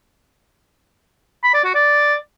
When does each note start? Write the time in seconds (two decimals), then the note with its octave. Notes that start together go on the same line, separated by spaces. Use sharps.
1.44 B5
1.54 D5
1.64 F#4
1.75 D5